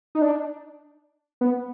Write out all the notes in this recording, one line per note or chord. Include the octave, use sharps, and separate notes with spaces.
D#4
D4
B3